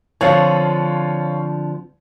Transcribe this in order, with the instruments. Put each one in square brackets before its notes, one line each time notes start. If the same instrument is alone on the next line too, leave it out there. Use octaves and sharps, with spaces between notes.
[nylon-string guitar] D3 F3 C4 [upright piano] F4 C#5